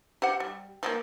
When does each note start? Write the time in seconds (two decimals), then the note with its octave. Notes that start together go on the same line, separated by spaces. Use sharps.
0.22 G4 C5 F#5
0.40 G3
0.83 F3 G3 A#3